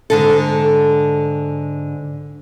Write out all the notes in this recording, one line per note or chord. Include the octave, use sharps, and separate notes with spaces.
G#2 D3 A4